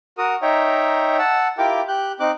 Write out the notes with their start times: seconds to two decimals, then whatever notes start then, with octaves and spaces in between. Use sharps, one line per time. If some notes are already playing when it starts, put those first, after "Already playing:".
0.18 F#4 A#4 D#6
0.42 D#4 C#5 E5 G5 A#5
1.19 F#5 A5 E6
1.58 E4 F4 G4 A#4 G5 D6
1.88 G4 F#6 G6
2.20 C4 D#4 D6 F#6